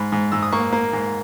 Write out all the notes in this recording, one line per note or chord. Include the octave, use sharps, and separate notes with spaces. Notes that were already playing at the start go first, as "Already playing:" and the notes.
Already playing: G#2 B5
G#2
G#2 E6
D#6
A#3 C#6
A#3
G#2